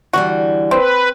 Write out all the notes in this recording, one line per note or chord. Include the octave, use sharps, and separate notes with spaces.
D3 E3 G3 F#4
C4 B4